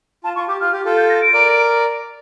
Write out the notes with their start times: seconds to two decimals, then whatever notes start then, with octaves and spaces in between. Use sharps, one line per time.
0.24 F4 A5
0.36 F4 C#6
0.48 G4 D6
0.61 F4 F6
0.73 G4
0.85 F4 A4
0.97 G6
1.09 A#6
1.22 D7
1.34 A#4 D5